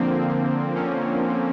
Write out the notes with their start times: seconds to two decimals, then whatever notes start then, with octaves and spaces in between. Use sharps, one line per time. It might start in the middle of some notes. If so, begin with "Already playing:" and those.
Already playing: D3 F3 A#3 C4
0.75 C#4